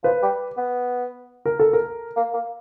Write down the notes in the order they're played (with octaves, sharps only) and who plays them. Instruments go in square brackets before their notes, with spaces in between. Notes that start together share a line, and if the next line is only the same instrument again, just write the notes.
[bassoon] F3 [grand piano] B4
[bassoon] G3
B3
[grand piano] A#4
A4
A#4
[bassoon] A#3
A#3